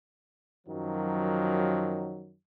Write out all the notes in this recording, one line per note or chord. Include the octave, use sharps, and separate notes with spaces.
F#2 D#3 F3 F#3